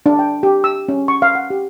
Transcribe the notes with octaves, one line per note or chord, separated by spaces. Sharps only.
D4
G5
G4
E6
C#4
C#6
F5
F#5
G4